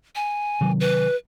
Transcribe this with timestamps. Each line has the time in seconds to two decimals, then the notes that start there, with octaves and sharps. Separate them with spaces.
0.16 G#5
0.61 C3 D#3 F#3
0.80 B4